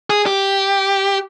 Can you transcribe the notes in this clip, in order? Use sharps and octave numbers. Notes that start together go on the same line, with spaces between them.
G#4
G4